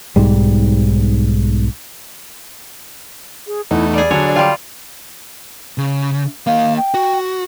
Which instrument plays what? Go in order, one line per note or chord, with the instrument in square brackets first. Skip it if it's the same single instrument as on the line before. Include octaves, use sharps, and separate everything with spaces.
[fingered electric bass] B1 G#2 G3
[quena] G#4
[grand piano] E2 [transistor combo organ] A3 D#4 [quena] E4
[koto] G3 G#4 [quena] D5
[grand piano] D3 F#3 [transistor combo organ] D4 G#5 [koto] C#5
[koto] G3 F4 [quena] G5
[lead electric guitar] C#3
[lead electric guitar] A#3 D#5 [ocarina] F5
[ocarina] G5
[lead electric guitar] F#4